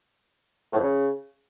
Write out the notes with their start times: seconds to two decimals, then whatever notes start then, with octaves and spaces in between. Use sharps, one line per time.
0.73 A2
0.78 F2
0.83 C#3